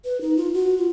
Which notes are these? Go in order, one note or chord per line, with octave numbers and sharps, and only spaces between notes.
B4
D#4
F4
F#4
F4